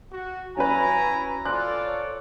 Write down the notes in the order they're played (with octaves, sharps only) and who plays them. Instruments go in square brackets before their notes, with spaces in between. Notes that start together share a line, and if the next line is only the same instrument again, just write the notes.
[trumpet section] F#4
[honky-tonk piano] F#3 C#4 B4 [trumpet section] E4 A#5 [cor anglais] G#5
[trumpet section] F4 A4 D5 [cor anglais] C5 [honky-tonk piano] F#6
[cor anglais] C#5